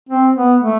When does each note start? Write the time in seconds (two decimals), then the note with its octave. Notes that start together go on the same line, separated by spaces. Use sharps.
0.09 C4
0.36 B3
0.62 A3